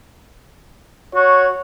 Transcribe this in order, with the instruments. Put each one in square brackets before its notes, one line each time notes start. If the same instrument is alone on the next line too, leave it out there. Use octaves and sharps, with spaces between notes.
[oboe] F#4 [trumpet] C#5